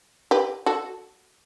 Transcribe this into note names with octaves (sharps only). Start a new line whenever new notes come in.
G4 B4
F#4 A4